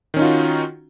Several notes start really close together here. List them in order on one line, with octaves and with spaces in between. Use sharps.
D#3 C#4 D#4 F4 F#4